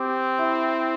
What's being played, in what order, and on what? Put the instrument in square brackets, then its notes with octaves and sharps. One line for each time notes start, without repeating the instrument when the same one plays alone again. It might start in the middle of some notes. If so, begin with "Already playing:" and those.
Already playing: [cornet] C4 [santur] G4
[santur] E4